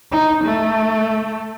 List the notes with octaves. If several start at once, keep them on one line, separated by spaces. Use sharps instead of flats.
D#4
A3